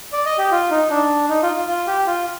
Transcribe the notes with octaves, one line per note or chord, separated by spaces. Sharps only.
D5
D#5
G4
F4
D#4
D4
D#4
F4
F4
F4
G4
F4